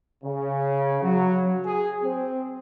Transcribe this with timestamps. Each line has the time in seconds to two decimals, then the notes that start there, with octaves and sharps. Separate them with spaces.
0.24 C#3
1.03 F#3
1.64 G#4
2.03 C4